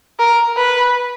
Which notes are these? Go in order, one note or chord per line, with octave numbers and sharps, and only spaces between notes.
A#4
B4